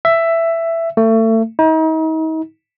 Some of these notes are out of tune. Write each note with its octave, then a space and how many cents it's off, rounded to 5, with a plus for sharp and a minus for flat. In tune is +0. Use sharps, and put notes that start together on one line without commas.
E5 +10
A3 +30
D#4 +40